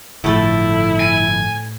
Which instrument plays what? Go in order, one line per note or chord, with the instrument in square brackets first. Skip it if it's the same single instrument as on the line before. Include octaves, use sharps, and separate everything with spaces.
[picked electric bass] G1 F3 [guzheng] A2 A4 [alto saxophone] E4
[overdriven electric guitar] G#5